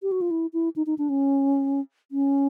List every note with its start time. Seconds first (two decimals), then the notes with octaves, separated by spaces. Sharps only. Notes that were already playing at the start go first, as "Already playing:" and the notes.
0.02 G4
0.12 F#4
0.21 F4
0.31 E4
0.53 E4
0.76 D#4
0.86 D#4
0.98 D4
1.09 C#4
2.11 C#4